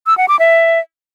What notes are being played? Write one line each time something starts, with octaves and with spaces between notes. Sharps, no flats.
E6
F#5
D6
E5